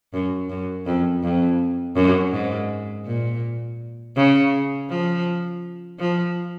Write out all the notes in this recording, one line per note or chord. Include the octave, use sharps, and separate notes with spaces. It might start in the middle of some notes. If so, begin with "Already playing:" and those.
F#2
F#2
F2
F2
F#2
G#2
A#2
C#3
F3
F3